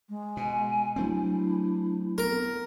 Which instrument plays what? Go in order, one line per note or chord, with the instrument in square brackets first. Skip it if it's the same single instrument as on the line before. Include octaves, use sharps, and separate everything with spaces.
[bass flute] G#3
[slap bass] B2 [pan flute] G#5
[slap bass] F#3 A3 C4 [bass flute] D4 [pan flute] E4
[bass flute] B3 [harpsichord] A#4